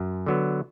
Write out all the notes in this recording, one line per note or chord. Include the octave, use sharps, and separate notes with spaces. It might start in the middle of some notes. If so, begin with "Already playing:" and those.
Already playing: F#2
D3 F#3 B3